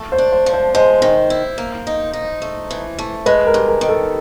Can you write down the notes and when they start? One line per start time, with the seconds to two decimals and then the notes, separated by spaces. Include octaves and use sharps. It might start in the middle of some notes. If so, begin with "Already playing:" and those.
Already playing: A3
0.12 C5
0.18 D4
0.32 C5
0.46 F3
0.53 C5
0.74 G#3 C5
1.02 D#3
1.30 E4
1.58 A#3
1.87 D#4
2.13 D#4
2.42 A3
2.71 E3
2.99 A3
3.26 G#3 B4
3.47 A#4
3.54 G2
3.68 A#4
3.81 D#3
3.89 A4